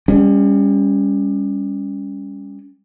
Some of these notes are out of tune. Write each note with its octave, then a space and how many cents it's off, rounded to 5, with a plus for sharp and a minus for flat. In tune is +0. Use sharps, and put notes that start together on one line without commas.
G3 +35 C#4 +10